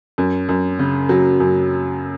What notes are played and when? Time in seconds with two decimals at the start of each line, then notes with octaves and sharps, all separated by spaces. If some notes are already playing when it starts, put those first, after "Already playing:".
0.18 F#2
0.49 F#2
0.79 C#3
1.09 F#3
1.40 F#2